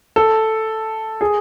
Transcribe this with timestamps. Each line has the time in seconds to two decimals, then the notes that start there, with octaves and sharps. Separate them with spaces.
0.16 A4
1.21 G#4